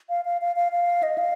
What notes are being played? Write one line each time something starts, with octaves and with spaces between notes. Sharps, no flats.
F5
F5
F5
F5
F5
D#5
F5